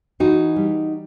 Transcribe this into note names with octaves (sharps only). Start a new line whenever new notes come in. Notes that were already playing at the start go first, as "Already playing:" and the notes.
E3 D#4 F#4
G3